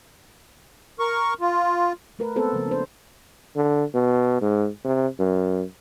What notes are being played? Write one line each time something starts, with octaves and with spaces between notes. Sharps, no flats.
A#4 C#6
F4
A3 A#4 B4
G#3 B3 C4 A4 B4 C5
C#3 F3 A#3
D4 C5
D3
B2
G#2
C3
F#2